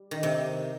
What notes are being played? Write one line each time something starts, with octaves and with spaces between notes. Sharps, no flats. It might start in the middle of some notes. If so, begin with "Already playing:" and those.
Already playing: G3
D#3
C3